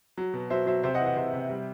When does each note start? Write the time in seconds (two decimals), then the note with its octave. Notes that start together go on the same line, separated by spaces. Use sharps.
0.18 F#3
0.34 B2
0.50 F#3 C5 E5
0.66 F#3 C5 E5
0.83 C3 C5 E5
0.94 D#5 F#5
1.00 E3
1.06 D#5 F#5
1.16 C3 C5 E5
1.34 C3
1.50 G3